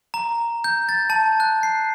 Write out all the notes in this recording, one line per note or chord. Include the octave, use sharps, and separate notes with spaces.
A#5
G6
A6
A5
F#6
C7